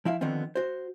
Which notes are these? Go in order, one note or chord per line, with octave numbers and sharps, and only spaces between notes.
F3 E4 E5 F5
D3 D#3 F3 B3 C4
F#4 C5